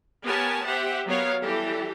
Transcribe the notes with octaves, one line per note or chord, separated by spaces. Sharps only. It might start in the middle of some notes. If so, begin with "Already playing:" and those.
B3 G4 A#4 C#5 G#5 A5
G4 C5 E5 F#5
F#3 B3 A#4 C#5 F5
E3 G3 G4 A4